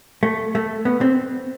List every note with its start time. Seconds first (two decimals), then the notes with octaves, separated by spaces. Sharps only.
0.23 A3
0.55 A3
0.85 B3
1.01 C4